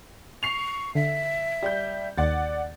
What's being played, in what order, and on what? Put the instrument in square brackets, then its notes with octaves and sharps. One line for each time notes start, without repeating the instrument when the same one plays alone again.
[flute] C#6 [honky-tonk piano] C7 F7
[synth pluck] D3 [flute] E5
[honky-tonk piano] G3 G6
[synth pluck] D#2 [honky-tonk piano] D5 F#5 A6